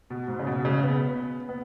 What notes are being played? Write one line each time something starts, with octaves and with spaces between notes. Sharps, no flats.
B2
G#2
C#3
B2
C#3
B3
B3